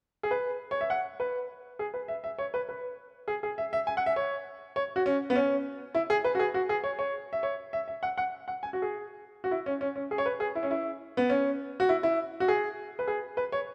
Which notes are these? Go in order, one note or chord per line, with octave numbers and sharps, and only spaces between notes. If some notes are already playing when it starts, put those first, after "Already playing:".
G#4
B4
C#5
E5
F#5
B4
G#4
B4
E5
E5
C#5
B4
B4
G#4
G#4
E5
E5
G#5
F#5
E5
C#5
C#5
F#4
C#4
B3
C#4
E4
G#4
B4
F#4
G#4
F#4
G#4
C#5
C#5
E5
C#5
E5
E5
F#5
F#5
F#5
G#5
F#4
G#4
F#4
E4
C#4
C#4
C#4
G#4
C#5
B4
G#4
E4
C#4
E4
B3
C#4
F#4
E4
E4
F#4
G#4
B4
G#4
B4
C#5